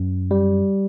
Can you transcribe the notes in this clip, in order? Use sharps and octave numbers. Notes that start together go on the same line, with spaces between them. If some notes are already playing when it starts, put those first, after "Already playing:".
Already playing: F#2
G3